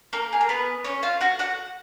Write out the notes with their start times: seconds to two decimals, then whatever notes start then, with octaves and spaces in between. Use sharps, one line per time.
0.13 A#3 A#4
0.33 G#4
0.41 A#4
0.49 B3 B4
0.84 C#4 C#5
1.03 F4 F5
1.21 F#4 F#5
1.39 F#4 F#5